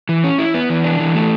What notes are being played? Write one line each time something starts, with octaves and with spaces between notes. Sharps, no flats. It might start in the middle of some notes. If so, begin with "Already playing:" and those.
E3
C#4
E4
B3
E3
D4
E3
A3